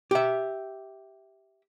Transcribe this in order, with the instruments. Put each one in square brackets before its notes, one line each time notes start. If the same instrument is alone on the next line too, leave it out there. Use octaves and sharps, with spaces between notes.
[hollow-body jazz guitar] G4 E5